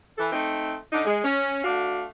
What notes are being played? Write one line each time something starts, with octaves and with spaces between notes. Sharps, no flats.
E3 A4
A3 C4 D#4
D3 D4 D#4
G#3
C#4
A3 D4 F#4 F5